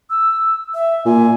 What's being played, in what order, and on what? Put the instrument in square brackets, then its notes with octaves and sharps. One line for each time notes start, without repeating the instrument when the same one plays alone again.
[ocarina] E6
E5
[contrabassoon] A#2 [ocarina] G#5